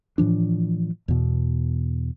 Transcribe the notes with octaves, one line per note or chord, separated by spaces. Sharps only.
A2 E3 F3 D4
E2 B2